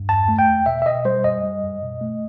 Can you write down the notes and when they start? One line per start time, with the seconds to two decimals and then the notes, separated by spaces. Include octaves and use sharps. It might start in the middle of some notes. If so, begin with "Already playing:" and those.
Already playing: G2
0.09 E2 A5
0.28 A3
0.39 G5
0.47 E2
0.66 B2 E5
0.82 E5
0.86 B2 D#5
1.05 G3 C5
1.24 F#2 D#5
1.43 G3
1.63 F#2
1.83 B2
2.01 A3